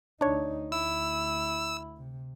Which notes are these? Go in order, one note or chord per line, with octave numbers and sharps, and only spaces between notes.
D2 D4 D#4 C#5
D2 E4 E6
C3